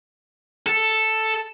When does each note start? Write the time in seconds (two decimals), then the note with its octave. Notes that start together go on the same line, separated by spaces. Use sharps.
0.66 A4